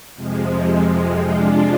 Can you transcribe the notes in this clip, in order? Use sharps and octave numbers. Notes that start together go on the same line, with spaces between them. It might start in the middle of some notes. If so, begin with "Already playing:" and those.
F2 C3 F3 G#3
C3 F3 G#3 D4 F4